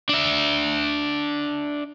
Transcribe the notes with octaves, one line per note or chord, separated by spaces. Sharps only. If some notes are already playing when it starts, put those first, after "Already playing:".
D4 E5